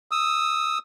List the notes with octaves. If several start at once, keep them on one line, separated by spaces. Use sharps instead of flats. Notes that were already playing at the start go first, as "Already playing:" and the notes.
D#6 E6